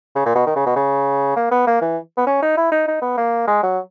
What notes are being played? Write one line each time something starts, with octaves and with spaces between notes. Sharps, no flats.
C#3
A#2
B2
D#3
C#3
B2
C#3
A#3
B3
A#3
E3
B3
C#4
D#4
E4
D#4
D#4
B3
A#3
G#3
F#3